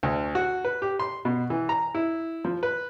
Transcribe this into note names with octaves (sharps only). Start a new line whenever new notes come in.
D2
F#4
B4
G4
C6
B2
E3
A#5
E4
F3
B4